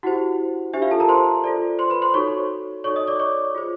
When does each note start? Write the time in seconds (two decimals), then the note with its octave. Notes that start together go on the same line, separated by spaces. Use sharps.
0.03 E4 F#4 G4 C5 F#5
0.74 D4 G4 C5 E5
0.82 F4 F5
0.91 A4 A5
1.00 A#4 A#5
1.08 C5 C6
1.44 F4 A4 D5
1.79 C5 C6
1.90 B4 B5
2.02 C5 C6
2.14 D#4 F#4 A4 C#5 C#6
2.84 D#4 F#4 A4 C#5 D5 C#6
2.96 D#5 D#6
3.07 D5 D6
3.19 C#5 C#6
3.55 F4 G#4 C5